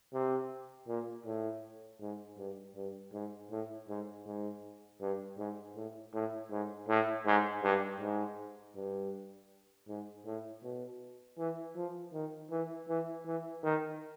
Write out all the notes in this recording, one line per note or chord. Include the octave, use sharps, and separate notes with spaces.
C3
A#2
A2
G#2
G2
G2
G#2
A2
G#2
G#2
G2
G#2
A2
A2
G#2
A2
G#2
G2
G#2
G2
G#2
A2
B2
E3
F3
D#3
E3
E3
E3
D#3